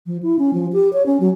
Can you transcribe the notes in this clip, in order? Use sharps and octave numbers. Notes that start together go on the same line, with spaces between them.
F3
E4
C#4
F3
G4
C#5
C#4
F#3